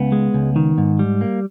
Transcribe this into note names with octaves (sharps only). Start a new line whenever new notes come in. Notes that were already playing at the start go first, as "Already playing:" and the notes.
Already playing: C#2 B3
G#3
C#2
D#3
G#2
G3
A#3